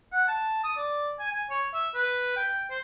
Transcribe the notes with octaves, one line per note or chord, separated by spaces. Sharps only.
F#5
A5
D#6
D5
G#5
G#5
C#5
E5
B4
G5
C5